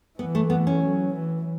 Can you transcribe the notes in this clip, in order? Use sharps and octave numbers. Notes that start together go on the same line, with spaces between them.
E3 B3
A3
B3
C#4
F#3
E3